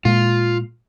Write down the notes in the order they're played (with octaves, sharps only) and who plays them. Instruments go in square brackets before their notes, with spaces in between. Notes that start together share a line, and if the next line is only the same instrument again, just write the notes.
[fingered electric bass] A#2 G#3 [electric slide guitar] F4